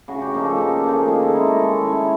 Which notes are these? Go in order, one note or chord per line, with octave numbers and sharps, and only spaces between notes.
C#3 F#4
G4
F3 A#3 D#4
A4
C#3
F3 A#3 D#4
D#3 G#4
A4
G#3 C#4 E4 A4
A#4
D#3 A4
G#3 C#4 E4 C#5